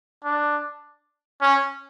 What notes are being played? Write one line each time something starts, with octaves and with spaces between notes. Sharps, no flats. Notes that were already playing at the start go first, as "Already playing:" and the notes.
D4
C#4